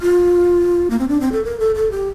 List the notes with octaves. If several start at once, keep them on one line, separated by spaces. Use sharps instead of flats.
F4
A#3
C4
D4
C4
A4
A#4
A4
A4
G4